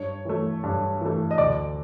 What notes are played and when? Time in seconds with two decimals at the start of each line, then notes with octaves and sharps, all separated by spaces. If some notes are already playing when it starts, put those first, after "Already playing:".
Already playing: G2 C#5
0.25 E3 A3
0.63 G2
1.01 E3 A3
1.31 D#5
1.38 D2 D5